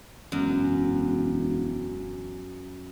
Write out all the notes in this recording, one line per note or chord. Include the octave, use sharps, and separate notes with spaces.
E1 F#2